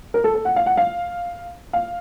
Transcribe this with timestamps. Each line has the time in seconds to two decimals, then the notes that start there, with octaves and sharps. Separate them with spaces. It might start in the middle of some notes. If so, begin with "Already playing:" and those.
0.14 A#4
0.24 A4
0.35 A4
0.45 F#5
0.56 F5
0.66 F#5
0.77 F5
1.73 F5